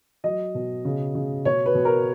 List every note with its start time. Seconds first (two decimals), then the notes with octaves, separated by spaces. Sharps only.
0.24 F#3 D#5
0.55 B2
0.85 C#3
1.15 C#3
1.45 B2 C#5
1.66 B4
1.75 B2
1.85 A#4